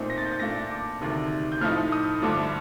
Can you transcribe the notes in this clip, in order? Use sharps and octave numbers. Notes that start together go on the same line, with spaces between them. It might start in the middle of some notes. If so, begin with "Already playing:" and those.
Already playing: A#2 A3 C4 D#4
A#6
A6
G6
A6
A#2 A3 D4 F4 A#6
D6
D2 C3 D#3
G6
A2 F3 A3 D#4 F6
D#6
G2 D3 F3 A3 D6